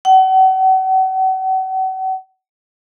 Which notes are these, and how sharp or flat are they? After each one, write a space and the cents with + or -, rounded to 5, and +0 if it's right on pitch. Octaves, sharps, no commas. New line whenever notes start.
F#5 +40